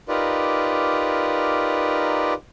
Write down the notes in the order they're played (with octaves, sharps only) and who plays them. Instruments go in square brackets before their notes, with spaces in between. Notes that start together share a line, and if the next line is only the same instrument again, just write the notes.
[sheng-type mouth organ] D#4 F4 G4 A#4 B4 D5